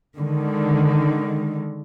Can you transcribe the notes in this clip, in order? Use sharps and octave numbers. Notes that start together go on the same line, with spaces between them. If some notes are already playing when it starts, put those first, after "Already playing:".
D3 D#3 G#3